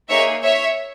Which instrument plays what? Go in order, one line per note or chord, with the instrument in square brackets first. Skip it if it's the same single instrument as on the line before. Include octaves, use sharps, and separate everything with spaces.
[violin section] A#3 D#4 G#4 C#5 E5
C#5 E5